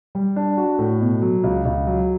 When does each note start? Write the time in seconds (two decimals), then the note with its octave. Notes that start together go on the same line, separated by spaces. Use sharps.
0.15 G3
0.36 D4
0.57 F#4
0.79 A2
1.01 B2
1.22 F#3
1.44 C#2
1.65 C#2
1.87 F#3